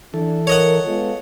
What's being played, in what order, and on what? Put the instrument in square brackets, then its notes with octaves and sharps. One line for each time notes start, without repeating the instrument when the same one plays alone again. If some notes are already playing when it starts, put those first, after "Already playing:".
[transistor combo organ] E3 A4 [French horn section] D4
[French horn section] A#4 [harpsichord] C#5 D#5 F#5
[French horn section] G#3 B3 F4 [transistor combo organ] A4